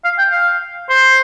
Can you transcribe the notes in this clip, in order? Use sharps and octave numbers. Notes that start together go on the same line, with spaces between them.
F5
G5
F5
C5